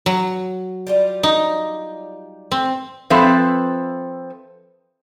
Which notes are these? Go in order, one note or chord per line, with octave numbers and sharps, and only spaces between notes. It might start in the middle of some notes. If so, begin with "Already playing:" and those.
F#3
G3 F4 G4
D#4
C4
F3 C4 A4 B4 E5